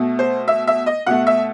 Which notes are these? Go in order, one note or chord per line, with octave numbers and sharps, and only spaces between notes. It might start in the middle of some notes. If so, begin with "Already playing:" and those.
Already playing: B2 A3
C5
E5
E5
D#5
B2 A3 F#5
E5